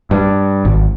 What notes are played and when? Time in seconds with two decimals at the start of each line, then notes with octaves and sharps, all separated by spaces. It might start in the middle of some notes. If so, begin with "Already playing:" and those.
0.11 G2
0.65 G#1